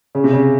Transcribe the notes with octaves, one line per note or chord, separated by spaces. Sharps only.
C#3
C3
C#3